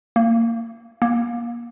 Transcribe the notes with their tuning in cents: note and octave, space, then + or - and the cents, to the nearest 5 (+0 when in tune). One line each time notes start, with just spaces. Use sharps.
A#3 -20
A#3 +30